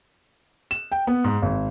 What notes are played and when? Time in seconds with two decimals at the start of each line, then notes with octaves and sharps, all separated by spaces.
0.71 E7
0.92 G5
1.07 B3
1.24 G#2
1.42 G#1